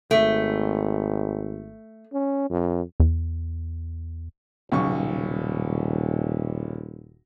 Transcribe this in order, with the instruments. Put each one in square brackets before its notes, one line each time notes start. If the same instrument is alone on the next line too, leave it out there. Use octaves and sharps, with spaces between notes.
[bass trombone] G#1 [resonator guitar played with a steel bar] A3
[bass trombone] C#4
F2
[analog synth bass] E2
[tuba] D#1 [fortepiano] B1 C#3 C#6